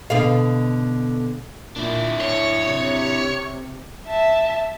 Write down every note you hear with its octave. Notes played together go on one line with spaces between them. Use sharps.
B2 D3 F5
A#2 D4 E4
A2 C#5
C3
E5 A5